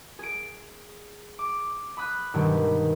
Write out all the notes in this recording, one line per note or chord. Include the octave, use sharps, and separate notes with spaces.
G#4 D7
D6
B5 D#6 F#6
G2 B2 D#3 G3 G#3